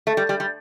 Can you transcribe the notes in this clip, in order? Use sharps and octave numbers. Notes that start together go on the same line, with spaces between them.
A3
G3
G3
G3